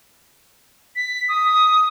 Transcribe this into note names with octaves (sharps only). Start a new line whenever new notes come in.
B6
D#6